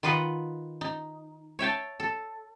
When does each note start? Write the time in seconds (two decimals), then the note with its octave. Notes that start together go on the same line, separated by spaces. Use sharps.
0.03 D#3 F4 B4 D#5 F#5
0.81 D#4
1.59 C#5 E5 G5 A5
2.00 A4